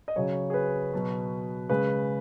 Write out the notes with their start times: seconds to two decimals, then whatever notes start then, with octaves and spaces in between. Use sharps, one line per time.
0.08 D#5
0.16 C#3 F#3 C#5
0.50 G#4
0.54 B4
0.93 B2 F#3
1.69 C#3 G#3 B4